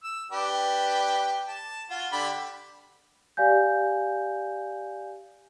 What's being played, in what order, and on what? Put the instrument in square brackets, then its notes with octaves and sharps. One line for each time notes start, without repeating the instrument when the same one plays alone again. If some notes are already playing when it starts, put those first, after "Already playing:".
[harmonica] E6
D4 G4 B4
A5
F4 F#4
D3 G4 B5
[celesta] G4 D5 F5 G#5 G6